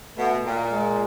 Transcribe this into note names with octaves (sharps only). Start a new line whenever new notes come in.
B2 A3
A#2
G#3